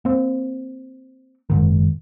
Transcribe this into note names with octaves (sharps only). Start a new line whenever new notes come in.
A#3 C4
F#1 G#2 D#3